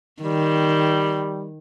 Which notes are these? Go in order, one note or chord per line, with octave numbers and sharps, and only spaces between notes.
D#3 G3